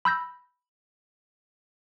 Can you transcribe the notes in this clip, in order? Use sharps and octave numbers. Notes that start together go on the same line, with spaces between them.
B5 E6 G6 A#6